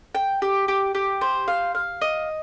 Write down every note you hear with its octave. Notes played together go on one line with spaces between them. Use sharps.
G5
G4
G4
G4
C5
F5
F5
D#5